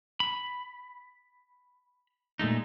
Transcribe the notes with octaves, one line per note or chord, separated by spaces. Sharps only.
B5
A#2 G#3 A3 D#4